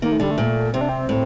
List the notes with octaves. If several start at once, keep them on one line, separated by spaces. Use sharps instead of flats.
D#3 A#3
A3
D3 G3
A3
A#2
C3 C4
D4
C4
A2